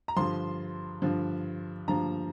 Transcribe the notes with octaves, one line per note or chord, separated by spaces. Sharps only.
A#5
G2 D3 F3 C6
G2 D3 F3
G2 D3 F3 A#5